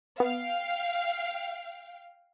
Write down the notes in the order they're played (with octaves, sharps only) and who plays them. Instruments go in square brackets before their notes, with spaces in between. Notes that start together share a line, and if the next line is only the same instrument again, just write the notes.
[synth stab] B3 [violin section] F5 G5